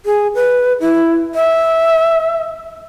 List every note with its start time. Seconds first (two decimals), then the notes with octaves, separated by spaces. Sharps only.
0.06 G#4
0.35 B4
0.80 E4
1.35 E5